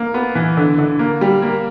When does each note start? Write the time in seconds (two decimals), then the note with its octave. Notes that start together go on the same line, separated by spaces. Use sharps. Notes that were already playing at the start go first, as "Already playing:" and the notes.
Already playing: A#3
0.14 B3
0.35 E3
0.57 D3
0.78 D3
0.99 A#3
1.21 G3
1.42 A#3